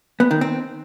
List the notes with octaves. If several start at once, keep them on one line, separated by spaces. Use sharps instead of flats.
B3
D#3
C4